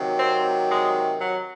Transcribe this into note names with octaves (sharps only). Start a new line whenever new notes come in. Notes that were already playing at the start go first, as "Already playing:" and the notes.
Already playing: C3 D#3 F#3
C4
G#3
F#3